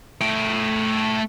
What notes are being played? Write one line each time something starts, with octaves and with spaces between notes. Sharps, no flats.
A3 G5